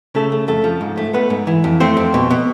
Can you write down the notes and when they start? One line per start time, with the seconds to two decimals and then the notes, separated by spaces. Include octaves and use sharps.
0.15 C#3 A3 A4
0.32 A3
0.48 F2 A3 A4
0.64 F3
0.81 G#2
0.97 A3
1.13 A3 B3 B4
1.30 G#2
1.47 E3
1.64 F2
1.80 A3 C4 C5
1.97 F2
2.14 B2
2.31 B2